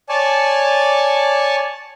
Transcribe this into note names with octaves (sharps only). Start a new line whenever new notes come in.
C#5 D5 G#5 A5